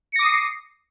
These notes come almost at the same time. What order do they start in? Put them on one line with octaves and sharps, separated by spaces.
C#7 A#6 D6 D#6 C7